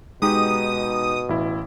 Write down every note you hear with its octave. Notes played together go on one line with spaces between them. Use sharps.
B2 G#3 D#4 G4 D#6
A1 E4